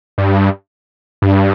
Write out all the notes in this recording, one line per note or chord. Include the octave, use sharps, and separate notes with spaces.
G2
G2